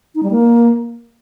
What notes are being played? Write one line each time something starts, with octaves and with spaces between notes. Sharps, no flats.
D#4
G3
A#3